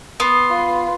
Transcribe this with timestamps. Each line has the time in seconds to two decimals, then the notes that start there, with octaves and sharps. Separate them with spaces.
0.20 B3 C6
0.50 F4 B4